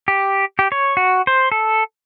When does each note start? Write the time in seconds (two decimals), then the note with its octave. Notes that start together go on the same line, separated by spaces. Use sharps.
0.08 G4
0.59 G4
0.72 C#5
0.97 F#4
1.27 C5
1.52 A4